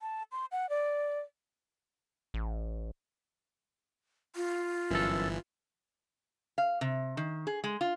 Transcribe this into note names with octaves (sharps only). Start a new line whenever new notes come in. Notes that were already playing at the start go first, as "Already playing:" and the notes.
A5
C6
F#5
D5
A1
F4
G1 F#2 E3 A4
F5
C3
D#3
G#4
G#3
F4